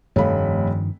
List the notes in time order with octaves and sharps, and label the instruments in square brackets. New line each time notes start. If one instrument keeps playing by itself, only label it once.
[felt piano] F1 A3 B5 [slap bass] G2 D#3 F3 [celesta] C#5 F5